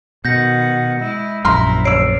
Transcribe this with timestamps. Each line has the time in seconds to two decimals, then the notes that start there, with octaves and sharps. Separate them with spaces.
0.25 B2 D#3 F#5 G6 A#6
0.99 G#3 E4
1.45 A#1 F#2 E4 A#5 C6 F6
1.85 D2 D3 C#5 E6 C7 D7